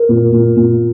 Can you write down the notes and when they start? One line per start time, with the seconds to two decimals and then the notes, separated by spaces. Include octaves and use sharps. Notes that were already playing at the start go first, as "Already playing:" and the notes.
Already playing: A#4
0.09 A#2
0.32 A#2
0.56 A#2